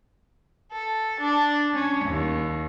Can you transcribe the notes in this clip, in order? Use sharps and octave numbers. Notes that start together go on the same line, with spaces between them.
A4
D4
C#4
D#2